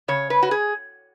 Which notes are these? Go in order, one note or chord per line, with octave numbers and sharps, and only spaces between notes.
C#3 C#5
B4
F#4
G#4